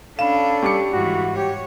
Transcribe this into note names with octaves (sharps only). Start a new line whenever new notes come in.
C#4 D4 A4 F5 B5 E7
G3 C#6 D6 C#7
G#2 E3 F#4
G4 C#5